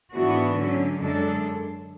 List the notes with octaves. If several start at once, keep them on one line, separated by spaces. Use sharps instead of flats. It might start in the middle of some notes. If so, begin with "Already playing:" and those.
G#2 E3 B3 D4 F#4
D3 F#3 C#4
F#2 D3 G#3 D4 A4